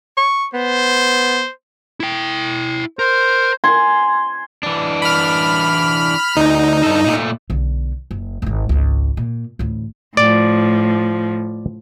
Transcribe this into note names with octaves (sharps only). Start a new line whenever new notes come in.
C#6
B3 C5
E4 G5
A#4 C5
G#5 C6
E3 D4
B5 F6
D2 D#4
G2 A4
A#2 A3
B1 D3
F#1
D#1 G#1
G#1 C#2
A#2
A1 D2
A2 F3 D5